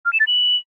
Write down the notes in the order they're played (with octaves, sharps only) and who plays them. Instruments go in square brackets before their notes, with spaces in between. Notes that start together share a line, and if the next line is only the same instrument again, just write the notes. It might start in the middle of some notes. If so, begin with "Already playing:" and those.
[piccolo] F6
E7
A6
F#7